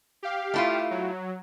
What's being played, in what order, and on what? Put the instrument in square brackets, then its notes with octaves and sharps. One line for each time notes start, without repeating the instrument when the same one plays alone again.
[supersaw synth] G4 F5
[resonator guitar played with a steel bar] A3 E4 F4
[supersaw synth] F#3